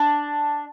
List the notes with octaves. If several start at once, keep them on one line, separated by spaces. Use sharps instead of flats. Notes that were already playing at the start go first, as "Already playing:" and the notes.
Already playing: D4